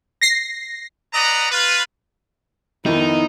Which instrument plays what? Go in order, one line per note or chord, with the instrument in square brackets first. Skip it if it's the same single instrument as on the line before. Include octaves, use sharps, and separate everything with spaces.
[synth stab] A#6 C7
[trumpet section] B4 D5 D#5 F#5 A#5
F4 B4
[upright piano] F2 D#3 [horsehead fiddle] B3 E4 [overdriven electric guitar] D#4